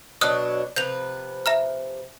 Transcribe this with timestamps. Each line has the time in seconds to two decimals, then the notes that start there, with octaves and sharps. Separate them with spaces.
0.21 B2 F#3 D4 D#6 F6 F#6
0.76 C3 F3 B4 G6 F7
1.46 E5 A#5 F6